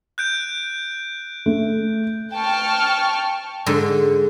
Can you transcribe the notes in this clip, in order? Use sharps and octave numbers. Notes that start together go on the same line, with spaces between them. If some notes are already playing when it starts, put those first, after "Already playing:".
F#6 G6 D7
A3
G5 A5 C#6 F6
G#2 D3 C6